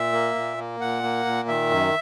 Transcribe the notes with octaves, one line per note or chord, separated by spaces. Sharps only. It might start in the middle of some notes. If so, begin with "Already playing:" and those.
Already playing: A#2 E5
A#3
A#2
A#3
A#2 F#5
A#3
A#2
D#3 E5
F#2